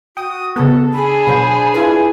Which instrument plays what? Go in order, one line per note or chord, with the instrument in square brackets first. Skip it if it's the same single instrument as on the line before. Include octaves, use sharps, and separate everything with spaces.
[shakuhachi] F#4 [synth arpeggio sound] G5 [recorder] D#6
[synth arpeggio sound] C#3 B3 [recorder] A4
[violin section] D4 G#4 [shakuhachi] B5
[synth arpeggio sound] B2 F#3 [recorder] C5
[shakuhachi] E4 [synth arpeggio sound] F4 A4 B4 [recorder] G#5